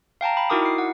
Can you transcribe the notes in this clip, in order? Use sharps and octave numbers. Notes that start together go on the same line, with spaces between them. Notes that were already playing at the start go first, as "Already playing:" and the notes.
F5 G5 A5 A#5
G5 B5
D#4 E4 F#4 A#4 D6 D#6
E4 C7
F#5